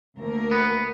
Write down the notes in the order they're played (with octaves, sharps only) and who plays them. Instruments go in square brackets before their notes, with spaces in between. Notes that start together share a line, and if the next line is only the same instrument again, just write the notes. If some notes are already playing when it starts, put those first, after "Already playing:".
[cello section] D2 A#3 A#4
[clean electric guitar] B3